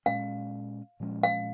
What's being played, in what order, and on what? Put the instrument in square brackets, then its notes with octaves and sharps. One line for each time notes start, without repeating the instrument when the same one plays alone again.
[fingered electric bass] A#2 G#3 C#4 [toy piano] F5
[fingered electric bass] A#2 F3 G#3 C#4
[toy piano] F5